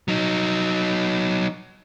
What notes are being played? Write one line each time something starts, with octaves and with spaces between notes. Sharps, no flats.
F#3 D#4